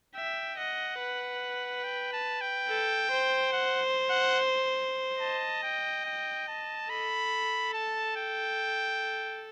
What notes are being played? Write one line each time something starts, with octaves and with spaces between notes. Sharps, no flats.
E5 G5
D#5 F#5
B4
G5
A5
G5
A4
C5
F#5
F#5
D#5 A5
G5
G5
A5
A4 B5
A5
G5